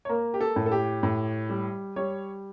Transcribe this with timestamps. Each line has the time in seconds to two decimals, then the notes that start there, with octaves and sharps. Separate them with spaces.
0.05 C#5
0.09 A#3 A#4
0.34 G4
0.41 A4
0.56 A2
0.66 A4
0.72 G4
1.03 A2
1.50 G3
1.96 G3 C#5